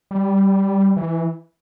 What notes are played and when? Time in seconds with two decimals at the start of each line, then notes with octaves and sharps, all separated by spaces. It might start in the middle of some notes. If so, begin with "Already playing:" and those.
0.11 G3
0.97 E3